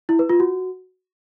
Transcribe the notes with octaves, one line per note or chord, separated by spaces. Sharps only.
E4
B4
F4
F#4